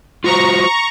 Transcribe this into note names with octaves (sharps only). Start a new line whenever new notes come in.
F4 F#4 C5 A#5 C#6